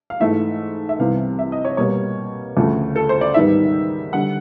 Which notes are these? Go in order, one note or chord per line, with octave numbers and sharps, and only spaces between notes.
F5
G#2 E3 A3 E5
E5
C2 C3 E3 G3 B3 F5
E5
D#5
C#5
B2 G3 A#3 C#5
D2 C#3 F3 A3
A4
C5
D5
G#2 D#3 G3 B3 E5
D3 G3 F#5